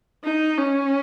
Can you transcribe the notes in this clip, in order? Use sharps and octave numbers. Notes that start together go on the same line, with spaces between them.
D#4
C#4